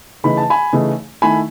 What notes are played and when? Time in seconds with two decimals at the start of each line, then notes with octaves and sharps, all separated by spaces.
0.24 C#3 E3 A3 D#4 B5
0.37 A5
0.50 G#5 B5
0.73 C#3 E3 A3 D#4
1.22 D#3 A3 E4 G#5 B5